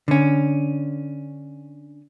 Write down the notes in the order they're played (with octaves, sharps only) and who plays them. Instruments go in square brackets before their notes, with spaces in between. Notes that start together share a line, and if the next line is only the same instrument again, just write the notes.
[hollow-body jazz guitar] D3 C#4